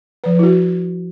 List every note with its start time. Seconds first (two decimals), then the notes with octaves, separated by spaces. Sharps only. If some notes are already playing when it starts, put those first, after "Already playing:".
0.24 F3 B4
0.39 E4 F#4